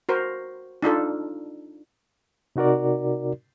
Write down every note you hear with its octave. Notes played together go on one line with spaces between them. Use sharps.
F#4 A#4 C5
D4 D#4 F4 A4
C3 D#4 F#4 A#4 D5